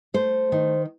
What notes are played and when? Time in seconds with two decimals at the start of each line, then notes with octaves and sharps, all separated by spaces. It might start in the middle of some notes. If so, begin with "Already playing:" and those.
0.14 A3 C5
0.52 D#3